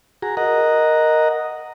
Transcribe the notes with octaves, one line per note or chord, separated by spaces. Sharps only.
F#4 G#4 A#5
A#4 D#5 F#5 A#5